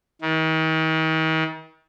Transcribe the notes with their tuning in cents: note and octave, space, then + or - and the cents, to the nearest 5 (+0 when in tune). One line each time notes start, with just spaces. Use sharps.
D#3 +40